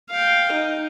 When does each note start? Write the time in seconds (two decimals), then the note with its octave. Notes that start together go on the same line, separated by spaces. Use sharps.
0.11 F5 G5
0.53 D#4